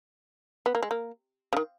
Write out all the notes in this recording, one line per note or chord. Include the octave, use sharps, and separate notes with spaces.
B3
A#3
G#3
A#3
C#3
D#3